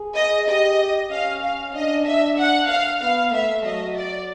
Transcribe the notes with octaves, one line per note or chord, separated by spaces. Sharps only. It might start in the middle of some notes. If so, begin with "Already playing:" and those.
Already playing: G#4
D#5
G4 D#5
C#4 F5
F5
D4 D#5
D4 E5
F#5
F5
B3 F5
A3 E5
F#3 D#5
D5